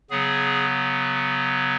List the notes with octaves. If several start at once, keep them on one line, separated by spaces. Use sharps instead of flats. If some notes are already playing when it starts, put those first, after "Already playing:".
C#3 F#3 B3 G#4